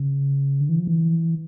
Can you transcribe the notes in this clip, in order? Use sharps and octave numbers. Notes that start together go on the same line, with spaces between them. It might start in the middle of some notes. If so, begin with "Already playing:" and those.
Already playing: C#3
D3
E3
F3
E3